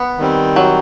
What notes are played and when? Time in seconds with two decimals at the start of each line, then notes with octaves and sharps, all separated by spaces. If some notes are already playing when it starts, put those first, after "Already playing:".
Already playing: B3
0.18 D#3 G3 C4
0.56 F#3